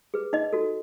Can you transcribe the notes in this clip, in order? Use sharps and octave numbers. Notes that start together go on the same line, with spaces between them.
G#4 B4
D#4 D#5
F#4 A4